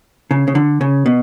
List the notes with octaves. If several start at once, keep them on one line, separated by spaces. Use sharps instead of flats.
C#3
C#3
D3
C#3
B2